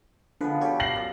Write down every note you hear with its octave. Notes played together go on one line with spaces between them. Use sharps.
D3 F3 G#3 B3 B4
G3 F#4 G4 A4 C#5
F5 A#6 C7 F#7
F#2